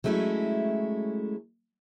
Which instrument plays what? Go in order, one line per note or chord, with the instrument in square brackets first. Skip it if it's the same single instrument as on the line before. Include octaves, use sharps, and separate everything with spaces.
[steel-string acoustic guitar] F#3 G#3 A3 C#4 E4